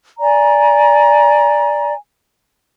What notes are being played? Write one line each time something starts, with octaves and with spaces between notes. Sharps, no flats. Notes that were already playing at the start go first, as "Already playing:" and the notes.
D5 G#5 A#5